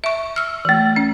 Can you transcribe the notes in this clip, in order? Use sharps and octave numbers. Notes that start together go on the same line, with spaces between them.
E5 C#6
E6 F6
E3 A3
C#4